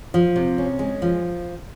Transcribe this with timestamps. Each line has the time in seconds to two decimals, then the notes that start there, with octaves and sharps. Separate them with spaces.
0.14 F3
0.36 C3
0.58 C#4
0.79 G#3
1.02 F3